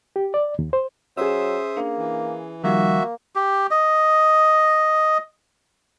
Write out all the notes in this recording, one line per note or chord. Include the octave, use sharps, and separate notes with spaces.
G4
D5
D#2
C5
F#3 C#4 G#4 C5 E5 D#6 E6
A#3 D4
E3
D#3 F3 G3 A#3 F#4 E5
G4
D#5